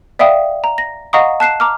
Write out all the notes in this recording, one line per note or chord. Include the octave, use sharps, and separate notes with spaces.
D5 E5 F5 G5 D#6
A#5
A#6
D#5 F5 F#5 A#5 C#6 D#6
A5 F#6 C7 E7
A#5 D6 F6